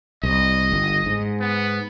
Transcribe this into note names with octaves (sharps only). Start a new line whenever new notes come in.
C2 D#5
G1
G#2
B3